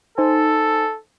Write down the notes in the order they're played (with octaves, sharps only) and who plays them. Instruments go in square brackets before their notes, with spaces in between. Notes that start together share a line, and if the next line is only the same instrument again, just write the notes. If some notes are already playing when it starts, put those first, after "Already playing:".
[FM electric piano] D#4 C5 G#5 [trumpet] A4